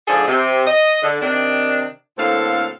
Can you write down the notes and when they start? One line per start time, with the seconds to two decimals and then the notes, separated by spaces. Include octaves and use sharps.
0.08 G#2 D3 F3 D4 G#4 A4
0.26 C3
0.66 D#5
1.02 D3
1.21 C3 D#3 D4
2.17 D2 A2 A#3 C4 A4 F5